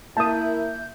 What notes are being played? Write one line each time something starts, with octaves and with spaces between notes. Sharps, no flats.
A#3 E4 A#4 E5 A5 D#6 G6